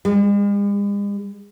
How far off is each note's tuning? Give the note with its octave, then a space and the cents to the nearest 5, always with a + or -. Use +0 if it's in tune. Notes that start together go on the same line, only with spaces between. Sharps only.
G#3 -45